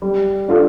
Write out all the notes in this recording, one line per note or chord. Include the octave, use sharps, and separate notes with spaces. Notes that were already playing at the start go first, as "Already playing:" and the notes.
G3
D4 F4 A4